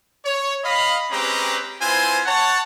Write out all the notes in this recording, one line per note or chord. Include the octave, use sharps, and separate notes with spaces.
C#5
D#5 F5 B5
G#3 C4 C#4 G4 B4 A#5
C4 E4 F4 B4 C5 G#5
C#5 F#5 A5